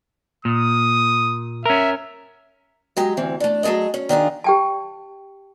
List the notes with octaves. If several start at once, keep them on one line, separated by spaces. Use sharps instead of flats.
A#2 D#6
C#4 A#4 E5
F#3 G#3 G4
D2 E3 C4
A3 D4
F#3 A3 G#4 A4 D#5
C#4
D#3 D4 F4 G#4
G4 G5 A5